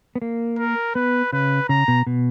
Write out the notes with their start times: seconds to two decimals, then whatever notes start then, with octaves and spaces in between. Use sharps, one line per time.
0.15 B3
0.22 A#3
0.58 A#4
0.95 B3 B4
1.33 C#3 B4
1.69 C#3 A#5
1.88 B2
2.07 B2